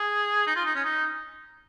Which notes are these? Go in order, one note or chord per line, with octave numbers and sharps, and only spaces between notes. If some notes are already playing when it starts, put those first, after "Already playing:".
Already playing: G#4
D#4
F4
D#4
C#4
D#4